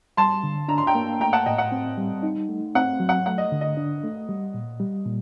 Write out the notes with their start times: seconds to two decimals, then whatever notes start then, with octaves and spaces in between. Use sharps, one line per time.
0.17 G3 A5 C6
0.43 D3
0.68 D4 A#5
0.78 C6
0.87 G5 A#5
0.95 A#3
1.20 A3 G5 A#5
1.33 F#5 A5
1.46 A2 D#5 G5
1.58 F#5
1.72 C4
1.97 G3
2.23 D#4
2.49 A3
2.75 C4 F#5
3.00 F#3
3.09 F#5
3.26 A3 F#5
3.38 D#5
3.52 D3
3.61 D#5
3.77 D4
4.04 A3
4.29 G3
4.54 A#2
4.80 G3
5.06 A#2